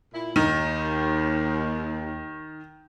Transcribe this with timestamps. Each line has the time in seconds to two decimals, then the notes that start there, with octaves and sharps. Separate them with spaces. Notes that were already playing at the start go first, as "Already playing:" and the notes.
0.14 A#2 E4
0.36 D#2 D#3